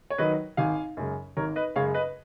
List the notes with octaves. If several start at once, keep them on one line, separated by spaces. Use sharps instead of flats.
C#5
D#3 F#3 B4 D#5
G#1 F5 G#5
F#2 C#3 G#3
G#1 A#4 C#5
B4 D#5
F#2 C#3 G#3 C#5 F5
B4 D#5